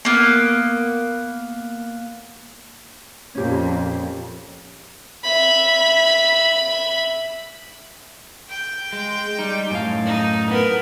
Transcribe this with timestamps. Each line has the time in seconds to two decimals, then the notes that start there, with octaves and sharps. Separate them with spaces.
0.05 A#3 B3
3.35 F2 A#2 C#4 G4
5.24 E5 B5
8.50 G5
8.93 G#3
9.39 G3 D#4
9.70 F#2 A2 F5
10.06 D#4
10.49 B3 A#4